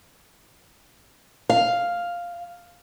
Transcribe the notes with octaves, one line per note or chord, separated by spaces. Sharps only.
F5